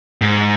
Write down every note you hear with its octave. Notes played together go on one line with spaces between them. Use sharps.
G#2